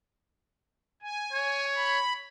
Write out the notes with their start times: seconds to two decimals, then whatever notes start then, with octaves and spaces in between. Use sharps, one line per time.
1.02 G#5
1.33 C#5
1.76 B5